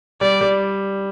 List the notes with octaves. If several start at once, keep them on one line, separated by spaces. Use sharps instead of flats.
G3 D5
G3